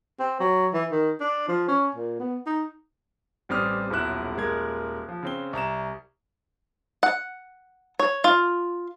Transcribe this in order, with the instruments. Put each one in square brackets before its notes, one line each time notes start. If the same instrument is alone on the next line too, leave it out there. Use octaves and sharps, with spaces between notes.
[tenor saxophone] C4
F#3
E3
D#3
D4
F3
C#4
A#2
B3
D#4
[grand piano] A1 G3 C4 D#6 F6
D#1 B1 E4 F#6 E7
D#1 G#3 A#4 G#6
F3
C#3 C4 G7
C2 A#5 E7
[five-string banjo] F#5
C#5
F4